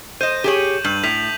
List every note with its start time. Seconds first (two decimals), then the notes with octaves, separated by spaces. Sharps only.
0.21 C5 D#5 G6 D#7
0.44 G4 G#4 C#5 E7 F#7
0.85 G2 G6 F#7
1.03 A2 B6 F7